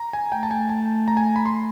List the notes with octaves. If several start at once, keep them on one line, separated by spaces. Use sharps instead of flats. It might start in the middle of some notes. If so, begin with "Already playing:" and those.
Already playing: A#5
G#5
A3 G5
A5
G#5
A5
A#5
G#5
B5
C6